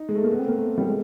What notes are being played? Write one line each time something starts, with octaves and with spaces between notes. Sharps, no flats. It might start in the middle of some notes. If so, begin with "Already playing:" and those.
Already playing: D#4
G#3
A3
A#3
B3
C4
A#3
A3
G3
G#3